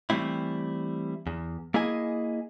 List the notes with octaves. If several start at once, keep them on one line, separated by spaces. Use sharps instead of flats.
E3 G3 A3 C4 E4
E2
A#3 E4 G#4 D#5 G#5